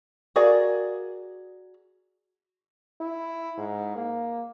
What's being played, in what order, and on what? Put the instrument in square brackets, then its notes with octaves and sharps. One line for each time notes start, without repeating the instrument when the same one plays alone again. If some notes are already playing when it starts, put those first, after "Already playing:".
[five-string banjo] F#4 G#4 A#4 D5 F5
[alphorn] E4
G#2
A#3